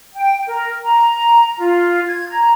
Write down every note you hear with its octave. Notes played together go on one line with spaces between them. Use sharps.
G5
A#4
A#5
F4
G#6
A#5